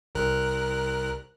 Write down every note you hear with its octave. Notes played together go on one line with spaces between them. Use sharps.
C2 A#4 F#6